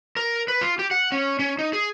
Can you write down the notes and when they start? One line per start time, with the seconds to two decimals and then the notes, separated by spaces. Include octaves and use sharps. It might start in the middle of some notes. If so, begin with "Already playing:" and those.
0.16 A#4
0.48 B4
0.61 F4
0.79 G4
0.91 F#5
1.12 C#4
1.39 C#4
1.59 D#4
1.73 G#4